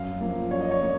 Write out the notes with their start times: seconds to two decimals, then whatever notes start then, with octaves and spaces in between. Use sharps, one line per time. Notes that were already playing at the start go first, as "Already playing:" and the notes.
Already playing: F#2 F5
0.21 F3 A#3
0.51 F#2 C#5
0.61 D#5
0.71 C#5
0.79 F3 A#3